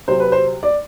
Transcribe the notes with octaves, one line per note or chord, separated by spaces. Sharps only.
C3 F#3 C4 C5
B4
C5
D5